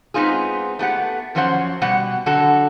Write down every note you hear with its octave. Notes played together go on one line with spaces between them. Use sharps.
G#3 B3 C4 D#4 F4 G#4
A3 B3 G4 F#5
F#2 F3 F#3 C#4 C5 F#5
B2 G3 F#5
D3 F#3 F#4 A4